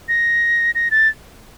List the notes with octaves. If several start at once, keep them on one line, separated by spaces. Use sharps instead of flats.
A#6
A#6
A6